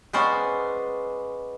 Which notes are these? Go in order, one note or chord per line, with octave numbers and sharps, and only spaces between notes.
G#3 B3 C#4 C5 D5